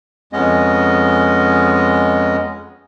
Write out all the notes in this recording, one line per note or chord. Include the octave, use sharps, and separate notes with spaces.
F2 G#3 B3 C#4 D#5